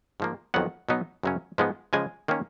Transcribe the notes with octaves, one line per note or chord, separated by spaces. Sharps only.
G#2 F3 A#3
F2 D#3 F#3 B3 F#5
B2 F#3 B3 D#4
F#2 C#3 F#3 C#4
G#2 F3 G#3 B3
C#3 F3 G#3 G#5
D#3 A#3 C#4